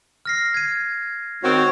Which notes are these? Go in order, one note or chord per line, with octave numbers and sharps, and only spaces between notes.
F6 A#6 C7
G#6 D#7
G#2 D#3 C4 F#4 C#5